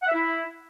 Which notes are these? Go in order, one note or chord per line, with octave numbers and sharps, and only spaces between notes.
F#5
E5
E4